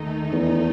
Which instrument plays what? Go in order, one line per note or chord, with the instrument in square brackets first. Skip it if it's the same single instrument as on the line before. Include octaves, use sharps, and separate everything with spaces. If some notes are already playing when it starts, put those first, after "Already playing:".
Already playing: [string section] D#2 D#3 A3 D#4
[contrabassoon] E2